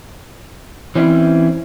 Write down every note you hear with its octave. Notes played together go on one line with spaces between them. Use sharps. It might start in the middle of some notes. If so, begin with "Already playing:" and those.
E3 C4 C#4 E4